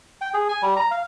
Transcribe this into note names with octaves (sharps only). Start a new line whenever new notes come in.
G5
G#4
G#5
G3
A#5
F5